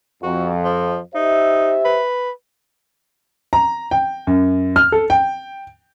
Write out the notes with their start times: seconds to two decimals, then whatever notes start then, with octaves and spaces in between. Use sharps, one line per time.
0.23 F2 F#4
0.64 F3
1.15 D#4 G4 C5 E5
1.85 B4
3.53 A#5
3.91 G5
4.27 F#2
4.76 F6
4.92 A4
5.10 G5